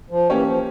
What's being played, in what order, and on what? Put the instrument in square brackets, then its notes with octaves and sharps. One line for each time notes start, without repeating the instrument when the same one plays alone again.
[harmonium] F3
[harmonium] E3 [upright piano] A#3 C#4 G4 C#5
[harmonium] F3